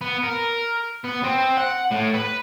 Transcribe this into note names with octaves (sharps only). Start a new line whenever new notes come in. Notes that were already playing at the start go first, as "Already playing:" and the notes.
B3
A#4
B3
C4
F#5
A2
B4